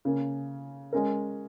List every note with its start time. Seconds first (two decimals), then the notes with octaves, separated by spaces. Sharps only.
0.05 C#3 A#3 C#4
0.93 G#3 C#4 A#4